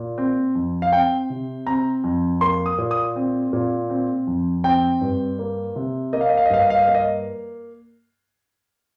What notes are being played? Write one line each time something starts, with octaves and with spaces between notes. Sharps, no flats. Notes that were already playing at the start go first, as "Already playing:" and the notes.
Already playing: A#2
C4
F2
F5
C4 G5
C3
C4 A#5
F2
A#3 C6
D#6
A#2
D#6
C4
A#2
C4
F2
C4 G5
G2
A#3
C3
A#3 D#5
F5
D#5
F5
D#5
G2 F5
D#5
F5
D#5
A#3 F5
D#5